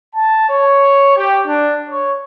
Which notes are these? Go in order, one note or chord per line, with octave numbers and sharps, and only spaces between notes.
A5
C#5
G4
D4
C#5